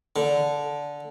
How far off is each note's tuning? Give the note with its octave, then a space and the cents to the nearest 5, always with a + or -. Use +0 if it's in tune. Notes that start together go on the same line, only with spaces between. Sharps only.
D3 -10